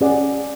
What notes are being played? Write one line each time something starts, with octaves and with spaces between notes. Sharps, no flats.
C#4 G#4 D5 F#5